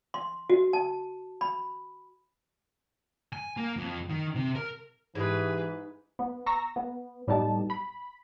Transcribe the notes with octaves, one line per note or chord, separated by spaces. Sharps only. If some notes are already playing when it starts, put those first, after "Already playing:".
C6
F#4
A5
B5
G#5
A#3
F2
D#3
C3
A#4
G#2 E3 G4 G#4 B4
B3
A#5 C#6 E6 A#6
B3
A2 G3 B3 D#4 G4 A5
B5